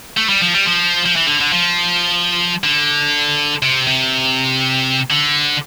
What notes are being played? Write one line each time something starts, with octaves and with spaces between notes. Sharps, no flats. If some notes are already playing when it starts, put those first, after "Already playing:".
A3
G3
F3
G3
F3
F3
E3
D3
D3
F3
D3
C3
C3
D3